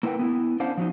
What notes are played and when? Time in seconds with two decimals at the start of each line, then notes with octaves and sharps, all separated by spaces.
0.03 A#3 E4 A#4 B4 F#5 G5
0.19 B3 D#4 E4
0.60 C#4 D4 C5 F5 F#5
0.77 F3 F#3 D#4